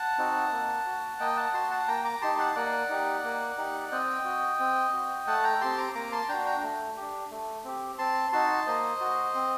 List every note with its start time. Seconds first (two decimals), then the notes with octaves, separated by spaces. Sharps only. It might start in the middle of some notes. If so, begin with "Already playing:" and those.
Already playing: F#5 A5
0.18 C4 D#4 F#4
0.52 A#3
0.86 F#4
1.20 A#3 D#5 G5
1.37 F#5 A5
1.54 F#4 A5 C6
1.71 F#5 A5
1.88 A#3 G5 A#5
2.04 A#5 D6
2.21 D#4 G4 A5 C6
2.38 F#5 A5
2.55 A#3 D5 F#5
2.89 D#4 G4
3.24 A#3
3.58 D#4 G4
3.91 C4 D#5 G5
4.25 F#4
4.60 C4
4.94 F#4
5.27 A3 F#5 A5
5.44 G5 A#5
5.61 C4 G4 A5 C6
5.78 A#5 D6
5.95 A#3 A#5 D6
6.12 A5 C6
6.29 D4 F#4 G5 A#5
6.46 G5 A#5
6.63 A3
6.97 D4 G4
7.31 A3
7.64 C4 G4
7.98 C4 A5 C6
8.32 D#4 F#4 A5 C6
8.66 A#3 C5 D#5
9.01 F#4
9.35 C4